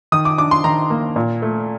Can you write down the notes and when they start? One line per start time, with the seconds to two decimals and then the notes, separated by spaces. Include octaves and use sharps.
0.12 D#3 D#6
0.25 D6
0.38 D4 D6
0.51 C6
0.64 D#3 A#5
0.90 A#3
1.16 A#2
1.42 A3